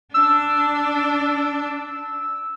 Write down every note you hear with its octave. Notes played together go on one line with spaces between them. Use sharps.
D4 E6